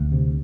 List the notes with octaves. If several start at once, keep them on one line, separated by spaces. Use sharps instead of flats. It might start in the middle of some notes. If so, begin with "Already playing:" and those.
Already playing: D2
C3